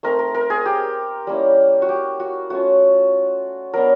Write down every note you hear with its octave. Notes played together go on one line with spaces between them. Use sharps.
A3 C4 D#4 A#4
A#4
A#4
G#4
G4
G3 A#3 C#4 E4
F#4
G4
F#4
A3 C#4 F4 F#4
F#3 B3 D4 A#4